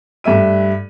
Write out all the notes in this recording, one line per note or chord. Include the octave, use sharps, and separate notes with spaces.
G2 A3 E5 D#7